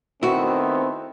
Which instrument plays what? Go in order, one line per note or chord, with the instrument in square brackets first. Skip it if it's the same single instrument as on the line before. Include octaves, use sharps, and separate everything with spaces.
[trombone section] D#3 A3 B3 [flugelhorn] C4 [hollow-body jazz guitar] E4 F#4